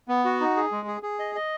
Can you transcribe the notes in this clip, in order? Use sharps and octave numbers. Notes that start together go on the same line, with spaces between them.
B3
F#4
D#4
G#4
G#3
G#4
G#4
D#5
D#5